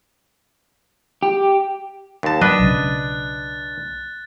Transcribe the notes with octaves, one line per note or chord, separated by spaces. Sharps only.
G4
D#2 A5
F#3 D4 B4 D#5 F#6 A6
B1 C#3